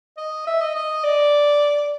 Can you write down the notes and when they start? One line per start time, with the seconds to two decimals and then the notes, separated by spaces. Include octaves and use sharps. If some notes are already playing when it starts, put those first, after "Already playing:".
0.17 D#5
0.47 E5
0.61 D#5
0.75 D#5
1.04 D5